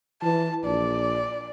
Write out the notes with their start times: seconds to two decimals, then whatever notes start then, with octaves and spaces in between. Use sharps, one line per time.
0.23 E3 A5
0.65 A#1 D5